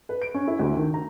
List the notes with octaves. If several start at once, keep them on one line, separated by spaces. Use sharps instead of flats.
B4
D7
C#4
E4
D2
D#3
A#5